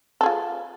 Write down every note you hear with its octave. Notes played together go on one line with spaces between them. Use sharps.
F4 G#4 A4